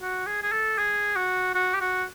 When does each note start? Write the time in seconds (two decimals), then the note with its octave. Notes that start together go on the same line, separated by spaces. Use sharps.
0.01 F#4
0.27 G#4
0.43 G#4
0.52 A4
0.78 G#4
1.16 F#4
1.55 F#4
1.74 G4
1.81 F#4